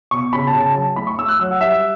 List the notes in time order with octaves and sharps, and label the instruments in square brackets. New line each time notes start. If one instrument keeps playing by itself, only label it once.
[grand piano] B2 C#6
C#3 B5
A5
C#3
A5
F#3 A5
A3 B5
C#6
A3 E6
F#6
F#3 E6
F#5
G3 E5